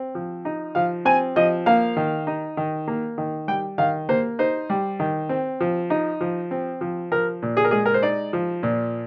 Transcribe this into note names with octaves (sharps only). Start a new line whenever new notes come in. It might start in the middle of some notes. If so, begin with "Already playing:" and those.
Already playing: C4
F3
D#4
F3 F5
C4 G#5
F3 D#5
A#3 F5
D#3
D#4
D#3
A#3
D#3
G3 G5
D#3 F5
A#3 C5
D#4 C5
G3
D#3
C4
F3
D#4
F3
C4
F3
F3 A#4
A#2
G#4
A#4
G#3 G#4
A#4
C5
D#4 D5
F3
A#2